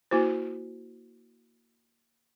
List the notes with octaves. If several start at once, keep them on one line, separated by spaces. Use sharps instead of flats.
A#3 E4 F#4 C5